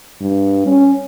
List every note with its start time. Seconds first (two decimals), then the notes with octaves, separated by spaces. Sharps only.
0.21 G2
0.67 C#4